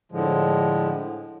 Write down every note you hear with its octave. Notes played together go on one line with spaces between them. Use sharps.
A2 D3 F3 G#3